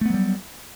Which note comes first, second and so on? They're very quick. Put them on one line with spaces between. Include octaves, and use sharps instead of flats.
A3 B3 F#3 G3